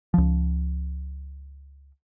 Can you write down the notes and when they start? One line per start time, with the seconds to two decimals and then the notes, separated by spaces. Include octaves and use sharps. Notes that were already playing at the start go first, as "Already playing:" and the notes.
0.14 C#2 F3